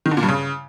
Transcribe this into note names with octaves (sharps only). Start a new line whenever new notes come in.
D#3
D3
A#2
G2
C#3